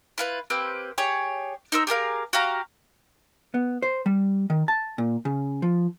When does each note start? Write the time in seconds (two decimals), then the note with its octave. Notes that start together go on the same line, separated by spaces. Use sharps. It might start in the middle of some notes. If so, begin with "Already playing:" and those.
0.18 E4 F4 B4
0.50 A#3 C4 G4 B4
0.98 G4 G#4 C#5
1.72 D#4 A#4 C5 E6
1.87 G4 G#4 A#4 F5
2.33 F#4 G4 F5 A#5
3.54 B3
3.82 C5
4.06 G3
4.50 D#3
4.68 A5
4.98 A#2
5.25 C#3
5.62 F3